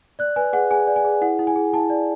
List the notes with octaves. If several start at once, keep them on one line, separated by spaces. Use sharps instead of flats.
D5 F#6
B4 G#5
G#4 F#5
G#4 G#5
D5
G#5
G#4
E4 F#5
E4
G#5
G#4
E4 A5
D5